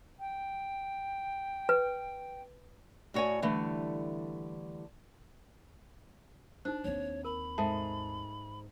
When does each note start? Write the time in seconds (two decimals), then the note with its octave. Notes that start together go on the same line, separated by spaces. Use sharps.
0.19 G5
1.69 B4
3.14 A2 F#4 C#5 D5 G#5
3.42 D3 E3 G3 A3
6.65 D4 D#4 C5
6.84 D#2 C4 C#5
7.25 A#4 B5
7.58 G#2 A4 E5 A5